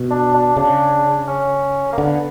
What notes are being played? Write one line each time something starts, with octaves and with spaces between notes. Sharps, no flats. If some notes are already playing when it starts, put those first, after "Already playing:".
Already playing: B2
D4
D4
C#3 D4
C#4
A#3
D3 B3